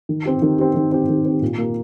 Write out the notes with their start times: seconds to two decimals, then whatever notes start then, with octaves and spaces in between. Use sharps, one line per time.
0.09 D#3
0.25 C4 G4
0.42 D#3
0.59 C4 G4
0.75 D#3
0.92 C4 G4
1.09 D#3
1.25 C4 G4
1.42 A#2
1.58 A#3 G4